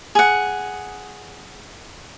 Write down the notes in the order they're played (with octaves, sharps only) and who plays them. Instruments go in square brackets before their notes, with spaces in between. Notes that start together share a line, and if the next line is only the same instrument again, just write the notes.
[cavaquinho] G#4 F#5